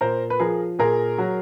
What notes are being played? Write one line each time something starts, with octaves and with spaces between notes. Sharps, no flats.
A#2 A#4 C5
B4
F3 G#4 A#4
A#2 G#4 A#4
F#3